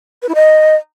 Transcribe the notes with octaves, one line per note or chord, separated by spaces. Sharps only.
B4
E4
D#5